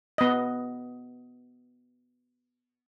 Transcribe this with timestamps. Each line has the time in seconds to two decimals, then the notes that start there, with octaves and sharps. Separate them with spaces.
0.18 B3 D#5